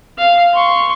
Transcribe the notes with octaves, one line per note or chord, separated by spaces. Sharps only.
F5
C6 C#6